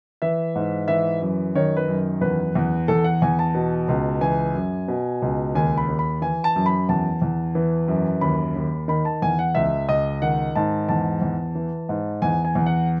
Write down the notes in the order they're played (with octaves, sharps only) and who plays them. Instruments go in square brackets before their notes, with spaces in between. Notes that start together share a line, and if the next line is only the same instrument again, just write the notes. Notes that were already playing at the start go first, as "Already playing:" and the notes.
[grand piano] E3 E5
G#2
E3 E5
F#2
D#3 C#5
B4
F#2
E2 B4
E2
E2 A4
F#5
E2 G#5
A5
B2
C#2
E3 G#5
F#2
B2
C#2
D#2 G#5
B5
D#2
B5
E3 G#5
A5
F#2
B5
E2 A5
E2
E3
F#2
D#2 B5
D#2
D#3 B5
A5
E2 G#5
F#5
C#2 E5
C#2 D#5
D#3 F#5
G#2 A5
E2 A5
E2
E3
G#2
E2 G#5
G#5
E2
F#5